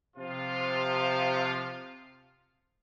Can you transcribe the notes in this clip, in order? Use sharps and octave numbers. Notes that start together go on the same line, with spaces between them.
C3 F3 F4